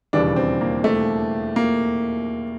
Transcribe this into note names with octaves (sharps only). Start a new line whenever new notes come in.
E1 D#2 C#3 E3 G3 D4
C4
A#3
A3
A#3